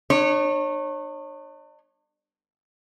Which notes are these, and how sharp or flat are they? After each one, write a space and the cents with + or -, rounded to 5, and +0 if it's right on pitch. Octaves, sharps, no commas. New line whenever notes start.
D4 +45 C#5 -25